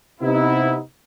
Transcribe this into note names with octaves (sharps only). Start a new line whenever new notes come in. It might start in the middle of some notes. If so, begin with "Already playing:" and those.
C3 B3 D#4 E4